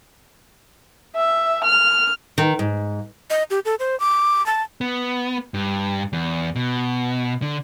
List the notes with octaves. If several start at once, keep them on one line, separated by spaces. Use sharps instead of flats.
E5
F6
D#3
G#2
D#5
G4
A4
C5
D6
A5
B3
G2
E2
B2
D3